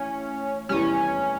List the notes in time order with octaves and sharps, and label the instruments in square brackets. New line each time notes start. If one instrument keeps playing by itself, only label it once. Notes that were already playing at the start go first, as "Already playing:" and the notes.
Already playing: [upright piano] A1 [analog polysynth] C#4
[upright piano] F1 E2 E3 G3 [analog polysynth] C#4